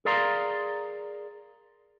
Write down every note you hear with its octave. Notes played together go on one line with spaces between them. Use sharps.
G#4 A#4 D5 F5 A#5 C6